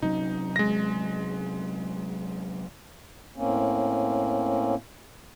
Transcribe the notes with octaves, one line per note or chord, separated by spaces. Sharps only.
C3 F#3 C#4 D#4
G#3 A#6
A2 A#3 C4 C#4